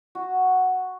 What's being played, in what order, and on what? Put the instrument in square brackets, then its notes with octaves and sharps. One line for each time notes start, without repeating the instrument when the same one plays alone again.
[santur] F#4